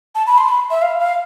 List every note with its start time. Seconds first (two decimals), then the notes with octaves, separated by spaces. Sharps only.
0.15 A5
0.27 B5
0.38 C6
0.48 B5
0.71 E5
0.82 F5
1.00 F5